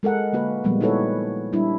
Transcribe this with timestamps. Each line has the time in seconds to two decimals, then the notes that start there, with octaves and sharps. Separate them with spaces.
0.03 G#3 A4 A#4 F#5
0.33 D3 A#3 F#4 B4
0.64 A#2 F3 G3 G#3 A#3 B3
0.81 D#4 E4 F#4 A4 B4 C#5
1.53 G3 D4 E4